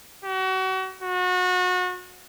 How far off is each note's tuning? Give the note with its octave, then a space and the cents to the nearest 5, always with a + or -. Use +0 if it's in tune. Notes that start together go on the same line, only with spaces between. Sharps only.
F#4 +35
F#4 -30